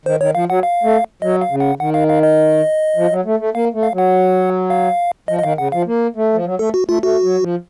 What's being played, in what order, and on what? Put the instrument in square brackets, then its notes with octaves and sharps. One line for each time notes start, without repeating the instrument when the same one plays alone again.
[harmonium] D#3 [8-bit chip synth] C5
[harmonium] D#3 [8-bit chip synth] C#5
[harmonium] F3 [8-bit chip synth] F5
[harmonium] F#3 [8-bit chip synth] F#5
[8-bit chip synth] F5
[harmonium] A3
[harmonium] F#3 [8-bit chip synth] D#5
[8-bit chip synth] F5
[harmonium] C#3
[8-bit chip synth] F#5
[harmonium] D#3 [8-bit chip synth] F#5
[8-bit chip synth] F5
F5
D#5
[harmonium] F3
F#3
A3
A3
[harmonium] A#3 [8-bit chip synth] F5
[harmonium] A3
[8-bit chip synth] F5
[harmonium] F#3 [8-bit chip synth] F#5
[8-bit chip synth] F5
[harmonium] F3 [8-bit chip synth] D#5
[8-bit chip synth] D#5
[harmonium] D#3 [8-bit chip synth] F5
[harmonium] C#3 [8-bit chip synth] F#5
[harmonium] F3 [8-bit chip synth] F5
[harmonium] A#3
A3
F3
F#3
[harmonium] A3 [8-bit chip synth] A4
[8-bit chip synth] F#4
[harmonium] A3 [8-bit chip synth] F4
[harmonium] A3 [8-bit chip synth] F#4
[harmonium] F#3
F3